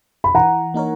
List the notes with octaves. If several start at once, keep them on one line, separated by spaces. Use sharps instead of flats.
B5
E3 F#5 A#5
A#3 D#4 A#4 C#5